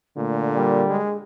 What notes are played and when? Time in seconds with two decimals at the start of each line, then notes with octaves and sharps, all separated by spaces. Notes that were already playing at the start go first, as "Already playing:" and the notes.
0.17 A#2 D3 A3
0.54 G3 A#3
0.90 G#3 G#4